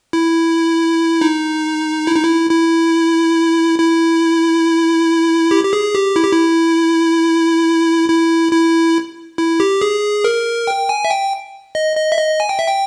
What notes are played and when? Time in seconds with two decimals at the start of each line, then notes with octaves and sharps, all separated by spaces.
0.13 E4
1.21 D#4
2.07 E4
2.16 D#4
2.24 E4
2.50 E4
3.79 E4
5.51 G4
5.64 G4
5.73 G#4
5.95 G4
6.16 E4
6.24 G4
6.32 E4
8.10 E4
8.52 E4
9.38 E4
9.60 G4
9.81 G#4
10.24 A#4
10.67 G5
10.89 G#5
11.05 E5
11.10 G5
11.75 D#5
11.97 D#5
12.12 E5
12.18 D#5
12.40 G#5
12.49 G5
12.59 E5
12.68 G5